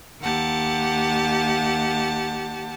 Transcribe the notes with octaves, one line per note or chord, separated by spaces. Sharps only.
D#2 G4 F#5 A5